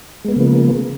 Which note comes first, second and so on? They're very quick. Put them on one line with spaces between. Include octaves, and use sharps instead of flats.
G#3 B3 A#3 C#3 F3